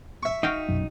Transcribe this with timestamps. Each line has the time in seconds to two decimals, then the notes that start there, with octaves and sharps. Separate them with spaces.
0.23 E5 C#6
0.43 D#4 F#4 F5 G5
0.69 F1 B1 F#2